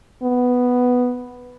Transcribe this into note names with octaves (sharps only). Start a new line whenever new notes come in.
B3